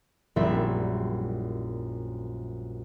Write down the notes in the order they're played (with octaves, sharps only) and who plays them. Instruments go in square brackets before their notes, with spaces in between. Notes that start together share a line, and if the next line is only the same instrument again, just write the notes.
[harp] A#1 F#2 G3 C4 E4 E5